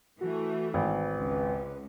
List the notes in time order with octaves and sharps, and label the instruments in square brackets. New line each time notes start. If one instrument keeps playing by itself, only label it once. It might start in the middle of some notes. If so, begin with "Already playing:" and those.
[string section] E3 A3 [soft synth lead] F#4
[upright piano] G#1 [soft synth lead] B4
[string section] C#2